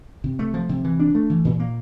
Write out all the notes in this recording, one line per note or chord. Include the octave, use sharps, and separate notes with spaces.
C3
A3
F3
C3
E3
D4
A3
E3
A#2
A#3